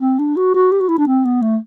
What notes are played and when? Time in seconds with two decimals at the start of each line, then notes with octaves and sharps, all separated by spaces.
0.01 C4
0.19 D4
0.37 F#4
0.54 F#4
0.72 G4
0.81 F#4
0.89 E4
0.98 D4
1.07 C4
1.25 B3
1.42 A3